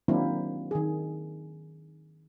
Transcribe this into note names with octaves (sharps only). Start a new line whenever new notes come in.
D#3 F#3 A#3 C4 D4 E4
D#3 G#4